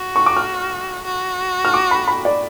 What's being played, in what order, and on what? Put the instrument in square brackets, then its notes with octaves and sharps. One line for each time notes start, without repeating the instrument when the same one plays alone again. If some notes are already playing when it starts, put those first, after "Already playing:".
Already playing: [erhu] F#4
[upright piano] C#6
D6
F6
[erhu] F#4
[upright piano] F6
D6
B5
B5
D5